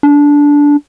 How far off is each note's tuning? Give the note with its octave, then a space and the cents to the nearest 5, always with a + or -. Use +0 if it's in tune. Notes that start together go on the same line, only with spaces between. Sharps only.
D4 -15